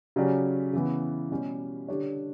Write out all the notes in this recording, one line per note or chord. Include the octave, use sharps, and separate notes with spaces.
C#3 F#3 C#4 G4 D5
C#3 E3 B3
B2 G3 C#4 G4
D3 G3 D4 G4 C#5